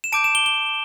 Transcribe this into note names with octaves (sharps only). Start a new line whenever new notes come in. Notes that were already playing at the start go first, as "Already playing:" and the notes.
E7
A5 D6 G6 D7
E7
G7
G7